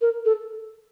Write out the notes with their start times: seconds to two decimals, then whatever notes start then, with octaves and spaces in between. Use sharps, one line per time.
0.01 A#4
0.25 A4